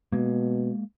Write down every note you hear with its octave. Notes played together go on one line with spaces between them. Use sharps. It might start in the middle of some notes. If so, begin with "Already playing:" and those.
B2 G#3 A#3